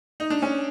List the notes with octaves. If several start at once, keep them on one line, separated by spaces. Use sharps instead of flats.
D#4
D4
C#4